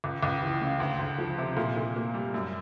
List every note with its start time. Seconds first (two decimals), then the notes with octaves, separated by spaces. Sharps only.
0.04 C#2
0.23 C#2
0.43 E3
0.61 C#3
0.80 D2
0.99 D2
1.18 F3
1.38 C3
1.57 A#2
1.76 A#2
1.96 A#3
2.14 G3
2.34 F#2